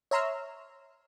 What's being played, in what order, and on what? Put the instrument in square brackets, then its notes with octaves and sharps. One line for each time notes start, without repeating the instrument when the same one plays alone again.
[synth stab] C#5 E5 A#5 C6 E6 F6